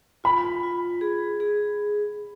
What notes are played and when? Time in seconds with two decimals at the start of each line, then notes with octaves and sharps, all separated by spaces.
0.24 F4 B5
0.63 F4
1.01 G#4
1.40 G#4